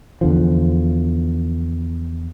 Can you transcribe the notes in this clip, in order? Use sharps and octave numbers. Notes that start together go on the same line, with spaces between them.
E2 D3 F3